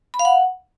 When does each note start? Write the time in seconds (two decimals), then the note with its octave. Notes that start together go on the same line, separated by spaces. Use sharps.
0.14 B5
0.19 F5
0.25 F#5